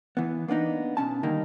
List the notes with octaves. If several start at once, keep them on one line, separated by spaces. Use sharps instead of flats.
E3 B3
A#3 B3 D4 D#4
B2 C4 C#4 A5
D3 D#3 G3 A#3 D#4